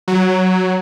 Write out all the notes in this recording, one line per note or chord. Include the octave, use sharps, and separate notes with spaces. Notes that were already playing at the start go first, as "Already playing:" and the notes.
F#3